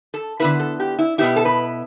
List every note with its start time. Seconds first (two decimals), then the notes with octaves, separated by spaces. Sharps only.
0.14 A4
0.40 D3 B3 E4 B4
0.60 A4
0.80 G4
0.99 E4
1.18 B2 B3 E4 G4
1.36 A4
1.45 B4